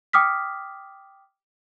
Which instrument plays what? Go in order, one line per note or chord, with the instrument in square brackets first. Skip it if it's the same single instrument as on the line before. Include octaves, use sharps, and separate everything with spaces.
[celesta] G5 D6 D#6 F6 B6